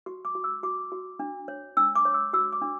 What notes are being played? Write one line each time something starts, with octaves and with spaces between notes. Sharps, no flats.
F#4 C#6
D6
F#4
E6
F#4 D6
F#4
D4
C#5
D4 E6
D6
C#5
E6
F#4 E6
D6
D4